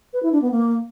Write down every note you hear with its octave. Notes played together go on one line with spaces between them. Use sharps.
B4
E4
D4
B3
A#3